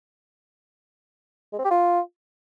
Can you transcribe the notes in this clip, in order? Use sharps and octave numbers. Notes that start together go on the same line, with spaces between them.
G#3
C4
G4
F4